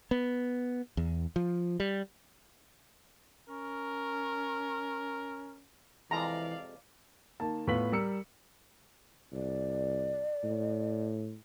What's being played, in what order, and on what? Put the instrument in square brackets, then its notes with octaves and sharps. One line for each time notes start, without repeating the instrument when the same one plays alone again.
[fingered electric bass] B3
E2
F3
G3
[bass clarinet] C#4 [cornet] A#4
[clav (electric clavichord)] F2 C3 G#3 [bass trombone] E3 [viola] D5 F5 [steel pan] A#5
[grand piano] D#3 A#3 A5
A2 B3 F4 B6 F#7
G3 A#4 E6 C#7
[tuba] C2 [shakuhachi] D5
[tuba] A2